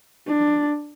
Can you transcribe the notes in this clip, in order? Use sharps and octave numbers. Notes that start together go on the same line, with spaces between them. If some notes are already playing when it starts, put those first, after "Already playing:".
D4